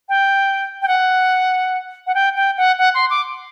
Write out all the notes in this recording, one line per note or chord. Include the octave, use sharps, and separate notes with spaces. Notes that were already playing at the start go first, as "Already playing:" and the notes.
G5
G5
F#5
F#5
G5
G5
F#5
F#5
C6
D6